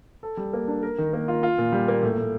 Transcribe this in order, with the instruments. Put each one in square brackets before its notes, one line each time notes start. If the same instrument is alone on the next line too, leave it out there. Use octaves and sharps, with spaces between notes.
[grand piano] A4
G3
A#3
D4
A#4
D#3
A#3
F4
F4
A#2
G3
A#3
A2
A2